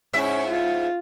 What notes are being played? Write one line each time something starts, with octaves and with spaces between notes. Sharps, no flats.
G#2 C#4 E4 E5
F4